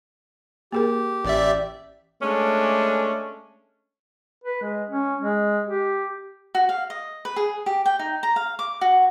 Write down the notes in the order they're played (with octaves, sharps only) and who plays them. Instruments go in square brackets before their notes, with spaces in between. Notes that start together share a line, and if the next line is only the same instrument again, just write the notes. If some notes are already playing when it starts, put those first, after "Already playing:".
[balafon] A#3 G#4 A#4 [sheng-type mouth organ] G4
[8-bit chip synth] A1 D5 E5
[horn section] G#3 A3 C#4 D4
[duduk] B4
G#3
C#4
G#3
G4
[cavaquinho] F#4
F5
D#5
B4
G#4
G4
G5
D#4
A#5
F5
D6
F#4